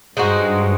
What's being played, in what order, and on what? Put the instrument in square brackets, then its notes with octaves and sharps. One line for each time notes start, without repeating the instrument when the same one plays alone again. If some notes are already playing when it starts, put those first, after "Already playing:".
[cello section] G2 [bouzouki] G#3 C4 D#4 F#4